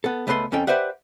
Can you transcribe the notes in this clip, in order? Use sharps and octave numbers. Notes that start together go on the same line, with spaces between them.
B3 A4
C#2 A3 B3 B4 C5 C6
F2 C#4 A4 G5
G4 B4 C5 D5 E5 F#5